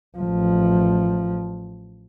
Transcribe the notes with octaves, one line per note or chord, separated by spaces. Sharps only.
A1 F3